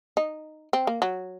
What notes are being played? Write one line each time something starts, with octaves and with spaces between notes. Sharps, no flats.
D#4
C4
A#3
F#3